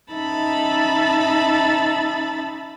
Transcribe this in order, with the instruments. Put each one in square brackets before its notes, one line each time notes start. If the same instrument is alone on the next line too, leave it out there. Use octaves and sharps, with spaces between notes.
[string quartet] C#4 D#4 E5 A5 B5 A6